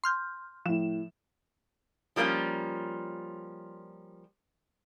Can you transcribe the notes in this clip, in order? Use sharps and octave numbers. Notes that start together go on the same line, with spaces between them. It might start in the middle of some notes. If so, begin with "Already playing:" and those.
C6 F6 G6
A2 F3 E7
F3 G3 A#3 C#4 F4